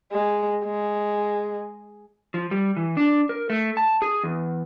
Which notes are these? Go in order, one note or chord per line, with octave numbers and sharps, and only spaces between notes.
G#3
G#3
F3
G3
E3
D4
A#4
A3
A5
G#4
E2